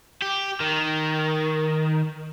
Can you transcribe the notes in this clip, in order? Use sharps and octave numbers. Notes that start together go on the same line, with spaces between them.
G4
D#3